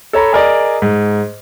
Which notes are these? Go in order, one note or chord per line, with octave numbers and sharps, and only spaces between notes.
A4 C#5 A#5 B5
G#4 A#4 D5 D#5
G#2